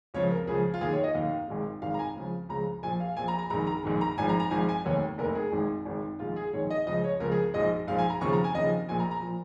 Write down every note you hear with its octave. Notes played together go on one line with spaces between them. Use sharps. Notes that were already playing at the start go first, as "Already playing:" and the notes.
C#2 C#3 F3 C#5
A#4
C#2 C#3 F3 G#4
F4
D#2 D#3 G#4
C#5
D#5
D#2 D#3 F5
G#1 G#2 D#3
G#1 G#2 D#3 F5
A#5
G#5
C#2 C#3 F3
C#2 C#3 F3 A#5
A#1 A#2 F3 G#5
F5
A#1 A#2 F3 G#5
A#5
A#5
A#1 G#2 D#3 A#5
A#5
A#1 G#2 D#3
A#5
G#1 G#2 F3 G#5
A#5
A#5
G#1 G#2 F3 G#5
G#5
F1 D#2 D#3 C#5
F1 D#2 D#3 A#4
G#4
G#1 G#2 D#3
G#1 G#2 D#3
A#1 G#2 D#3 F4
G#4
A#1 G#2 D#3 C#5
D#5
C#2 C#3 F3 D#5
C#5
C#2 C#3 F3 A#4
G#4
A#1 G#2 F3 D#5
A#1 G#2 F3 F5
G#5
A#5
D#2 C#3 F3 C#6
A#5
G#5
D#2 C#3 F3 D#5
A#1 A#2 F3 G#5
A#5
A#5
A#2 F3